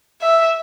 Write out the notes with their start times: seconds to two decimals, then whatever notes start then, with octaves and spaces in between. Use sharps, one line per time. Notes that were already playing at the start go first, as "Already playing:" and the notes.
0.22 E5